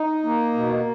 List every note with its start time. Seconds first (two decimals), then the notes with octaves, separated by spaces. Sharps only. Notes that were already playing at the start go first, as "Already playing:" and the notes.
Already playing: D#4
0.24 A#3
0.54 B2